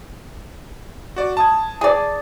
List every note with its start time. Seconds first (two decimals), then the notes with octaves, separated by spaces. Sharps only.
1.16 F#4 D5
1.37 A5 D#6 G#6
1.81 G#4 D5